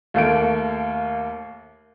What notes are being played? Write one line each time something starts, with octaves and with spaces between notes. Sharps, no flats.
D#2 A3 A#3 D7